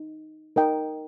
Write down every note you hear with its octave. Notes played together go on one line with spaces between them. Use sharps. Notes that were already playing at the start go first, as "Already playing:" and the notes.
Already playing: D#4
D#4 A#4 D#5 G5